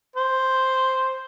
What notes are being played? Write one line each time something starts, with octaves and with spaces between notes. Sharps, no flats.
C5